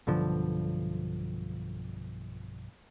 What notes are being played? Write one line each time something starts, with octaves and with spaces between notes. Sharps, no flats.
B1 G2 D3 F3